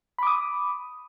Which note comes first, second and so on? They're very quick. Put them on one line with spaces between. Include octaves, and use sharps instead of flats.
B5 D6 D#6